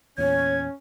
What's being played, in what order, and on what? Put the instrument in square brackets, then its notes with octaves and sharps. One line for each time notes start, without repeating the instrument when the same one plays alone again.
[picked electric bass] E2 A#2 [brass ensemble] C#4 [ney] C#5 [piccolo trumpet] G#6